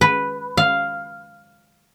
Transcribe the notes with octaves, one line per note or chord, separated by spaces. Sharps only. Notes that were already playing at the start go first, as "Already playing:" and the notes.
B4
F5